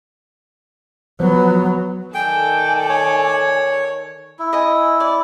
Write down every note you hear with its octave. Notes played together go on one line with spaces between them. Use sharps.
F3 F#3 B3
D#3 A4 D5 G5 G#5
C#5
E4
D#5 G#5
D5